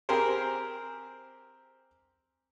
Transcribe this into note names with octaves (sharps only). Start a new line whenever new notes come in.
C4 G4 G#4 A#4 C5